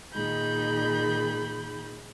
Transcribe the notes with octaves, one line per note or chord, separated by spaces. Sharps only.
A#2 D#3 D#4 G#4 B5 G6